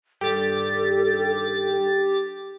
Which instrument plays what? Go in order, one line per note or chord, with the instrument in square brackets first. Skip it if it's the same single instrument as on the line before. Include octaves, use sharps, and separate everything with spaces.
[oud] G2 D#3 [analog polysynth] G4 A6 [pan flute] A4